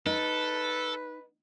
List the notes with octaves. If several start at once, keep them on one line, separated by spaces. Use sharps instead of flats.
D#4 A4 B4